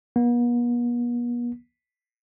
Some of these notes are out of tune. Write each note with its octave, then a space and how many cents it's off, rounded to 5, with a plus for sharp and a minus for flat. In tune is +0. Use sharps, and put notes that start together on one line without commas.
B3 -45